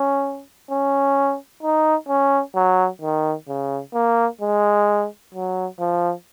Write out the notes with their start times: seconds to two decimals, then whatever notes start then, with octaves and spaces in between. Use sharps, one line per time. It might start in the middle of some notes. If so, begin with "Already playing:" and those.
Already playing: C#4
0.71 C#4
1.63 D#4
2.09 C#4
2.56 F#3
3.02 D#3
3.48 C#3
3.94 A#3
4.41 G#3
5.34 F#3
5.80 F3